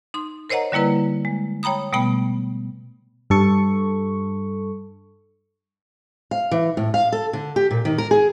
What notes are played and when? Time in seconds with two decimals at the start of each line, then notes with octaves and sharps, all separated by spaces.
0.14 D#4 C6
0.50 A#4 C5 C#5 D#5 F#5 A#5
0.72 D3 G3 A#3 E4 B4
1.25 G#3
1.63 C#5 G5 A#5 B5 D#6
1.93 B2 G3 A3 B3 G5 B5
3.30 G2 A4 C#6
6.31 F5
6.51 E3
6.77 A2
6.94 F5
7.12 A4
7.33 D3
7.56 G4
7.71 A#2
7.85 D#3
7.98 A#4
8.11 G#4